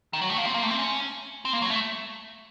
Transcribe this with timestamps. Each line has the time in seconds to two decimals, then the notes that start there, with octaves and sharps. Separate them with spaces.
0.13 D#3
0.21 F#3
0.30 A3
0.38 A#3
0.46 C4
0.54 A#3
0.63 A3
0.70 C4
0.79 C#4
1.45 C4
1.53 A#3
1.62 F#3
1.70 A3